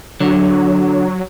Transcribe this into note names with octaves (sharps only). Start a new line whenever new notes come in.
D3 F#3